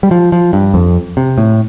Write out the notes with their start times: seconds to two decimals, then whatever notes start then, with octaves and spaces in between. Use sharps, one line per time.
0.03 G3
0.11 F3
0.32 F3
0.53 G2
0.74 F2
1.17 C3
1.38 A2